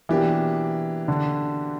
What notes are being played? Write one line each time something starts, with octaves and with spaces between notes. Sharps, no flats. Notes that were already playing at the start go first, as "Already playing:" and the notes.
B2 E3 A#3 D4 G4
D3